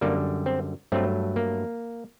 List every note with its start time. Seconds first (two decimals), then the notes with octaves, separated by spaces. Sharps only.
0.01 F#2 D3 G3 A#3
0.46 C4
0.92 G2 F#3 A3 C4
1.36 A#3